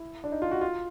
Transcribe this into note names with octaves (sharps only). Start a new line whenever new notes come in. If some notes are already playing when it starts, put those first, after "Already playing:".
Already playing: E4
D4
D#4
F4
F#4
F4